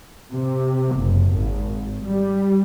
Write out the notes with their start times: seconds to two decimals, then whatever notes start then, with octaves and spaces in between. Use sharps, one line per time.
0.32 C3
0.96 F#1
1.31 G#1
2.05 G3